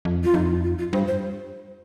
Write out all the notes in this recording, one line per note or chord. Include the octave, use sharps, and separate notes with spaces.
F2
F4
F2 D#4
F4
F4
G2 C5
C5